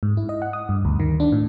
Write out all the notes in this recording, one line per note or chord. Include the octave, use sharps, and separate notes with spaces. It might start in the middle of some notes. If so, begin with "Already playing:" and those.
G#2
E4
D#5
F#5
D#6
G2
D2
D#3
D4
A2